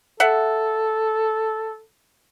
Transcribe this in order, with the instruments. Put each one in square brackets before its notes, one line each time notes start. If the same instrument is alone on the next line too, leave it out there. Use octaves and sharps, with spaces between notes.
[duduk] A4 [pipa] E5 F#5